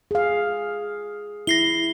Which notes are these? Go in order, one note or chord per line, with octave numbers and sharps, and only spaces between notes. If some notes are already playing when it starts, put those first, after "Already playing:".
G#4 F5
E4 A#6 C7 G7